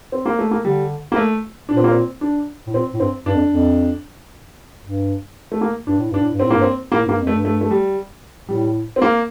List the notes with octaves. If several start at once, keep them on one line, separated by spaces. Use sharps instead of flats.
C4
A#3
A3
A#3
D3 G3
A#3
A3
A#2 D4
C4
A#3
C4
D4
A2
A#2 C4
A2
G2 C4
G2 D4
F2
F2
G2
A3
A#3
G2 D4
A2
G2 D4
A2
G2
A2 C4
G2 A#3
C4
A2 A#3
G2 A#3
F2
A3
G2
A3
A3
G3
A2 G3
C4
A#3